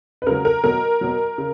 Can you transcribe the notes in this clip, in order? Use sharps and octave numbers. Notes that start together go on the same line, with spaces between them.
B4
C#3 F#3 A#4
A#4
B2 F#3 A#4
B2 F#3
C#3